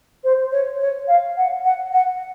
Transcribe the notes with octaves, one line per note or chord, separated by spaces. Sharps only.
C5
C#5
C#5
F5
F#5
F#5
F#5